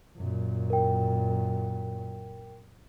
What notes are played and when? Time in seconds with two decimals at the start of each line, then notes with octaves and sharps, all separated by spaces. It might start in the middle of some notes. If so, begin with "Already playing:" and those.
0.17 F#2 A#2
0.70 A#4 G5